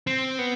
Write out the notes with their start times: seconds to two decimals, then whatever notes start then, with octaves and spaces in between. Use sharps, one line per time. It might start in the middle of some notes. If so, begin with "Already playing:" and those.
0.07 C4
0.39 B3